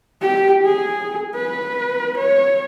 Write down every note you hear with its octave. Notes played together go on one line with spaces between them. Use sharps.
G4
G#4
B4
C#5